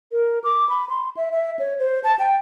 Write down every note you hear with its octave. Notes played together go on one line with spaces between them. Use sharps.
A#4
D6
B5
C6
E5
E5
C#5
C5
A5
G5